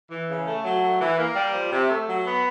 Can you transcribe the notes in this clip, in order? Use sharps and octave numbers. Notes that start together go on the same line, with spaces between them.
E3
C#3
A3
F#3
A3
E3
A#3
G3
F3
C3
A3
F#3
B3